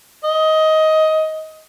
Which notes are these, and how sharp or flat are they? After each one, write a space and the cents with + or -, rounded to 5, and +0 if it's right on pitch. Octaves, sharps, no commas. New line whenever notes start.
D#5 +15